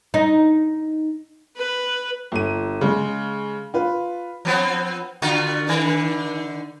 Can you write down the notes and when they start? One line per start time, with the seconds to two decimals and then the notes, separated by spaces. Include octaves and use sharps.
0.14 D#4
1.57 B4
2.32 G1 D#7
2.81 C#3 G#3
3.74 F4 B4
4.45 F3 B3 C4
5.22 D3 F4 F#4
5.68 D3 D#3